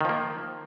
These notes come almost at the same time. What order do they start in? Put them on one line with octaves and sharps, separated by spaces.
D#3 F3 A#3